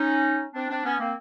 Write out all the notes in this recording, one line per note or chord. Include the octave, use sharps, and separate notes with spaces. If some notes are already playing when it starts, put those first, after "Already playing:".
Already playing: C#4 D#4
C4 D4
C4 D4
B3 C#4
A#3 C4